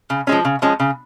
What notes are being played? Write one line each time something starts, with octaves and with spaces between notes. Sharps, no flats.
C#3
F3 G#3 C#4
C#3
F3 G#3 C#4
C#3